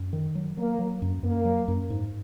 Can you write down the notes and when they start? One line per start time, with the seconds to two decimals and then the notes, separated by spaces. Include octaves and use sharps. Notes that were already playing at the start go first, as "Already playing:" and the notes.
Already playing: F#2
0.13 D#3
0.35 F#3
0.57 F#3 A#3
0.79 F#3
1.02 F#2
1.23 F#2 A#3
1.45 F#3
1.68 F#2
1.90 G#2